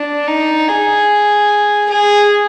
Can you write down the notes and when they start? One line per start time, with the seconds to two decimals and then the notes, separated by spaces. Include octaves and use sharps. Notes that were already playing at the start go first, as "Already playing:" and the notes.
Already playing: D4
0.28 D#4
0.68 G#4
1.89 G#4